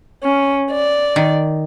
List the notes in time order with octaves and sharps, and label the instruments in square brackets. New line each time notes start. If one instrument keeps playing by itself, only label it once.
[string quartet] C#4
D5
[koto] D#3